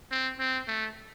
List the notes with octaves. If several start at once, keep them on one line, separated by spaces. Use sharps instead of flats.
C4
C4
A3